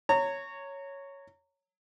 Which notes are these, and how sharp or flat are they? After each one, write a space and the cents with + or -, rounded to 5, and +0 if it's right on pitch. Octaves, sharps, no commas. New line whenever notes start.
C#5 +0 A#5 -25